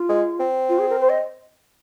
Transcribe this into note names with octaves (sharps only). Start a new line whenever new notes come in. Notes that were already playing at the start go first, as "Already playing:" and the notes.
Already playing: F4
G#3
C4
F4
G#4
A#4
C5
D#5